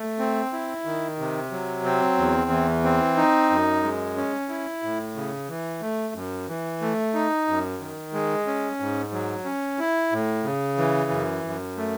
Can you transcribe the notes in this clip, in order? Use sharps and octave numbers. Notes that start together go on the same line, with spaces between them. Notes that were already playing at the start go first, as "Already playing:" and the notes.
Already playing: A3
C4
E4
D#3
C3
F#3
C4
E2
E3
C4
D#4
F#2
G#3
C#4
E4
A2
C#3
E3
A3
F#2
E3
A3
D#4
F#2
D#3
G#3
C#4
G#2
F#3
C#4
E4
A2
C#3
E3
F#2
F#2
A3